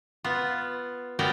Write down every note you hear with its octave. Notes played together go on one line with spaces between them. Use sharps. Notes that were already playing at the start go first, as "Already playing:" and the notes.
B3 F4
F#3 G3 B3 A#4 D5 G5